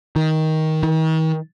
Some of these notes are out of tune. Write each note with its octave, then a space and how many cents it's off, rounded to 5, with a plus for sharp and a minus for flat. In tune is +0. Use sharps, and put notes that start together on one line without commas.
D#3 +15
D#3 +40